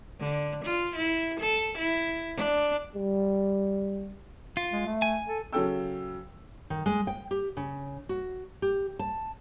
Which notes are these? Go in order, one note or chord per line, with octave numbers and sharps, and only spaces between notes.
D3
F4
E4
A4
E4
D4
G3
F4
G#3
A3
G#5
A4
C#3 F#3 C#4 A4 G5 E6
D#3
G#3
G5
G4
C#3
F#4
G4
A5